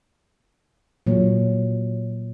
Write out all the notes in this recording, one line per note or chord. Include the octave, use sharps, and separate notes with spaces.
A#2 F#3